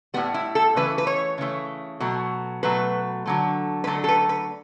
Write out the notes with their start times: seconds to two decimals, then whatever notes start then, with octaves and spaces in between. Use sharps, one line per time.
0.14 A2 G3 B3
0.34 E4
0.55 A4
0.76 C#3 E3 A3 B4
0.98 B4
1.07 C#5
1.38 C#3 E3 A3
2.00 B2 F#3 A3
2.63 B2 F#3 A3 B4
3.26 D3 F#3 A3
3.84 B4
3.87 D3 F#3 A3 A4
4.04 A4
4.08 B4
4.29 B4